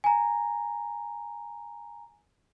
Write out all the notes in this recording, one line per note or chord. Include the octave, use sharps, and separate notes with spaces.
G#5 A#5